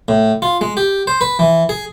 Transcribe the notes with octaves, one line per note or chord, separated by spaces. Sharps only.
A2
F4
G#3
G4
C5
B4
E3
G#4